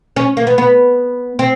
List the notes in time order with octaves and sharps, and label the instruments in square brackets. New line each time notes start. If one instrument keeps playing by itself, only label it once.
[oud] C#4
A#3
B3
B3
C4